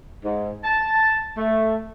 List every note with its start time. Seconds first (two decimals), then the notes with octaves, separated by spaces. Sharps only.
0.23 G#2
0.63 A5
1.37 A3